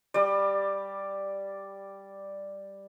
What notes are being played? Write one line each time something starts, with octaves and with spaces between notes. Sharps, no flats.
G3 D5